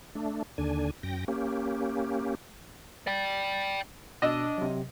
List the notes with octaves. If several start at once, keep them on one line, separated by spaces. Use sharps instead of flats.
A3 D4
D#2 D3 D4 G#5
F#2 G5 A#6
A#3 C#4 G4
D5 G5
B2 D4 D#5 E6
C3 F#3